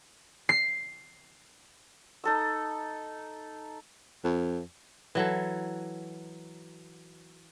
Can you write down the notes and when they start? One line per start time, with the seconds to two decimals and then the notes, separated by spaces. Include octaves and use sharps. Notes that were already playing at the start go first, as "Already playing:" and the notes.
0.49 C7
2.24 D#4 A4 E6
4.24 F2
5.15 E3 F#3 A4